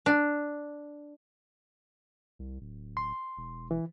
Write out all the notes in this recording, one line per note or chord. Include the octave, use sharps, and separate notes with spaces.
D4
C2
D1
C6
E1
E3